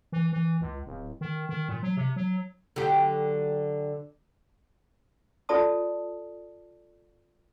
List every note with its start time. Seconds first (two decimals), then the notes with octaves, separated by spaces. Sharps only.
0.12 E3
0.33 E3
0.61 C#2
0.86 D1
1.21 D#3
1.49 D#3
1.69 A#2
1.83 F#3
1.97 C3
2.16 F#3
2.76 D3 F#3 G4
5.49 F4 A4 D5 A5 D#6